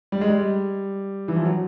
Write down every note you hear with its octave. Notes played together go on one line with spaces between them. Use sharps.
G3
G#3
G3
E3
F3
F#3